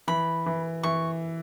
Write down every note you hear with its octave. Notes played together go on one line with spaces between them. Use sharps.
E3 B5
E3
E3 C#6